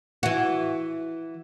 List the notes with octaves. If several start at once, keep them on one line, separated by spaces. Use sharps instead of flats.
E3 F#4